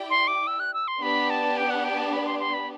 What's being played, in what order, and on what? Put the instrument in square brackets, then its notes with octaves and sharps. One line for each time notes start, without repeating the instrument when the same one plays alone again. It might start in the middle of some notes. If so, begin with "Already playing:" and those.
Already playing: [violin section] E4 G4 D5 G5
[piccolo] C6
D6
E6
F#6
E6
C6
[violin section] B3 D4 G4 [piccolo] B5
[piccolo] A5
G5
F#5
G5
A5
B5
C6
C6
B5